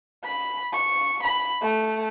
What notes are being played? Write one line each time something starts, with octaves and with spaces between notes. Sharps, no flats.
B5
C#6
B5
A3